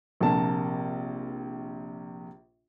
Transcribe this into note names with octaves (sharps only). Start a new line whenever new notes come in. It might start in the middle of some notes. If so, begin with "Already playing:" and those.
A#1 C3 A#3 A5